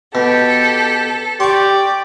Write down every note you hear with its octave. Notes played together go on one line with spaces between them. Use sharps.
B2 G4 A4
G4 D5 C6 C#6